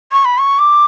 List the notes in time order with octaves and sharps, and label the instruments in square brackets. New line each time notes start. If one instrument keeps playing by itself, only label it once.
[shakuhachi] C#6
B5
C#6
D6